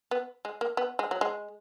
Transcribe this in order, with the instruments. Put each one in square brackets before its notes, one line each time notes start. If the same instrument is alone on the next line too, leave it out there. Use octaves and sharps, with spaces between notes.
[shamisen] B3
G#3
A#3
B3
G#3
F#3
G#3